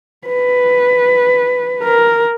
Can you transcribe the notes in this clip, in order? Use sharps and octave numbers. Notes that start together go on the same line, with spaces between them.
B4
A#4